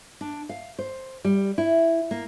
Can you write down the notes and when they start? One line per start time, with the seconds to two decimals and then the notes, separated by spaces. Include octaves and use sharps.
0.21 D4
0.49 F5
0.79 C5
1.25 G3
1.58 E4
2.11 A#3